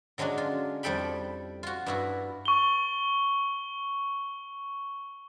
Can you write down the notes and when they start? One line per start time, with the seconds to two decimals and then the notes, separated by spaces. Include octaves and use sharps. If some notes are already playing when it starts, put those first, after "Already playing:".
0.18 D3 F#3 G#3 C#4 D4
0.38 F4
0.83 F2 G3 E4 A4 G5 B5
1.63 F4 F#4
1.86 G2 E4 F#4
2.45 C#6 G7